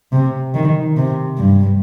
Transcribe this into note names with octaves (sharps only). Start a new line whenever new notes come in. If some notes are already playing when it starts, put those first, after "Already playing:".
C3
D#3
C3
G2